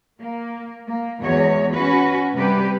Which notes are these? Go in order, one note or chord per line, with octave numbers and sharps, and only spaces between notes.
A#3
A#3
E2 G#3 F#4 C#5
C#4 F#4 B4
C3 G3 G4 B4